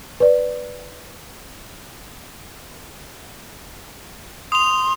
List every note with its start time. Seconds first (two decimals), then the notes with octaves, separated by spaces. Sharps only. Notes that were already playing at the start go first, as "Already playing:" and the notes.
0.20 B4 D5
4.52 C6 D#6 F7